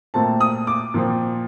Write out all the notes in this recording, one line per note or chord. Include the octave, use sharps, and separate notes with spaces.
A#2 A3 C4 A5
D#6
D6
A#2 F3 C4